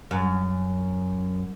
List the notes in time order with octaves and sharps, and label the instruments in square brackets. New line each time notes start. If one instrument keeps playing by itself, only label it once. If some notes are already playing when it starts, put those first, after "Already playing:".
[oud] F#2